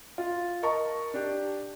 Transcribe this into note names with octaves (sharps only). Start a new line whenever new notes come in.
F4
A#4 D#5 A5 A#5 C#6
D4 G4